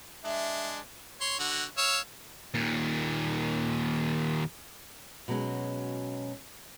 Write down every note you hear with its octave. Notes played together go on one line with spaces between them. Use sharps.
G#3 D4 E5
C#5 C6
D3 F#4
C#5 F5 E6
D#2 A#2
B2 F#3 G#3 C#4